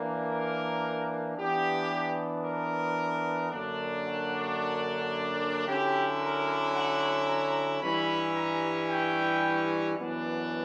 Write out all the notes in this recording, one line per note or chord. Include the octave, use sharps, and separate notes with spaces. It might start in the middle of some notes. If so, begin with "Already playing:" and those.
Already playing: E3 A#3 D4
A#4
E3 B3 D4 G4
A#4
F#2 D3 A#3 D4
F#4
D3 F#3 C#4 E4 G4
A#4
F#5
A#5
G2 E3 G3 C#4 E4 B5
A#5
G5
F#2 E3 B3 D4